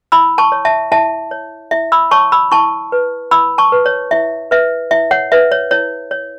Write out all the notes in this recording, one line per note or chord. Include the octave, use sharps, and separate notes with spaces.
E4 B5 E6
A5 C#6
C#5
E5 A5
E4 E5 A5
C#5
E4 E5
B5 E6
C#5 A5 C#6
B5 E6
E4 A5 C#6
B4
E4 B5 E6
A5 C#6
B4
C#5
E4 E5
B4 E5
E4 E5
C#5 F#5
B4 E5
C#5
E4 C#5
C#5